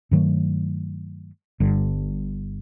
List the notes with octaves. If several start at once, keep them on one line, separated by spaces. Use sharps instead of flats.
G2 D#3 F#3 A3
G1 G2 D3